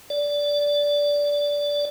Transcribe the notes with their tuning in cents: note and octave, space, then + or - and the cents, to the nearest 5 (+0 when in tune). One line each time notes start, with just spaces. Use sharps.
D5 -15